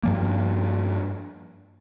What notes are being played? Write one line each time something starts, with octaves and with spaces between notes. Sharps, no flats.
G2 F3 A#3